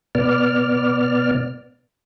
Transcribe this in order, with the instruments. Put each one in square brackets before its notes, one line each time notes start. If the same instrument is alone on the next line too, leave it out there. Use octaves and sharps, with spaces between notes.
[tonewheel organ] B2 B3 D5 F6